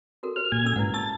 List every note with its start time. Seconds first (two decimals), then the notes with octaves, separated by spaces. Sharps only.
0.23 F#4 A4 A#4
0.36 G4 C5 F6
0.52 A#2 G#5 G#6
0.64 C#4 A4 E6
0.76 G#2 E4 B4 F#5
0.94 A5 C#6 E6 A6